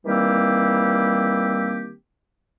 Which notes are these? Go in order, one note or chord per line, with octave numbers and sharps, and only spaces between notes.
D#3 E3 G3 A#3 C4 G4